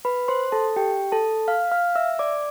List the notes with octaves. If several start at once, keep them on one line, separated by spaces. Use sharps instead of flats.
B4 B5
C5 C6
A4 A5
G4 G5
A4 A5
F5 F6
F5 F6
E5 E6
D5 D6